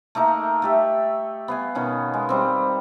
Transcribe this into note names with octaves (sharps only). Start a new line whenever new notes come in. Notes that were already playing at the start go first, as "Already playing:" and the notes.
A3 A#3 D#4 A#4
A3 G4 E5
B3 F5 G#5
B2 D#3 C#4
G#3
G3 C4